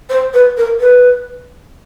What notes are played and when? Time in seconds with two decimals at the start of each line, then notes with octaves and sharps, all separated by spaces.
0.09 C5
0.33 B4
0.57 A#4
0.80 B4